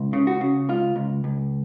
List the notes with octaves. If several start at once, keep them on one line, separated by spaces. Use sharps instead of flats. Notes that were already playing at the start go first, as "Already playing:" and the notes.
Already playing: C#2
C#3
F#4
C#3
C#2 F4
C#2
C#2